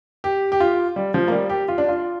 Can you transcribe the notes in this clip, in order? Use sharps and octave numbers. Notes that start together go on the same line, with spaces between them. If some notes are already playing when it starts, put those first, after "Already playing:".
G4
G4
F4
G3
F3
A#3
G3
G4
F4
D4
F4